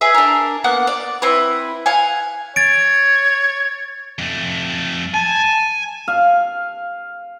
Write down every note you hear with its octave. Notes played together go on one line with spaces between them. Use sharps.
G#4 B4 E5
D4 A#4
A#3 B3 F#5
D5
C4 E4 B4
F5 F#5 G#5
C#5 A6 D7
F2 A3
G#5 A5
F5